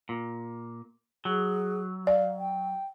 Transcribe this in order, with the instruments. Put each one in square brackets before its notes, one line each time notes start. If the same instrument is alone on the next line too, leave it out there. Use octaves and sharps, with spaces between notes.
[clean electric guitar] A#2
[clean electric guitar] F#3 [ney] G#4
[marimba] D5 [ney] F5
[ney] G5